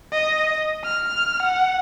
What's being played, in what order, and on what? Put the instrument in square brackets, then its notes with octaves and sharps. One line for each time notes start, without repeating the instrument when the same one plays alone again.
[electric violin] D#5
F6
F#5